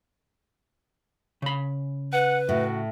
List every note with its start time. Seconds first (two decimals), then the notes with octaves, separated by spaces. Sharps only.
1.42 C#3 B5
2.13 B4 F#5
2.49 A2 F#4